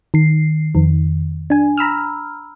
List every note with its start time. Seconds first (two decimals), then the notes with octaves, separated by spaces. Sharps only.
0.14 D#3 C7
0.75 F2 D#3
1.50 D4 G#5
1.78 A#5 B5 E6 F6